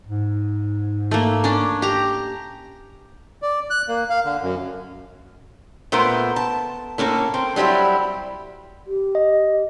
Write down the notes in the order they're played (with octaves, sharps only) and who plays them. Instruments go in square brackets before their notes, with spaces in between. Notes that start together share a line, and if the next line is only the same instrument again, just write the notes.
[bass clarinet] G#2
[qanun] A3 A#3
C#4 D4
G4 A#5
[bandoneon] D5
F#6
A#3
F5
D3
F#2
[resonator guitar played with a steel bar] A#2 A3 B3 A#4 C5
A5
A2 A#3 C#4 A4
C4
F#3 G3 B3 C4 E4
[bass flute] G4
[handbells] D#5